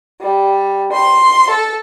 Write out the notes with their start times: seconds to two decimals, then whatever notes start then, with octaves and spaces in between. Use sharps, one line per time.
0.20 G3
0.92 C6
1.49 A4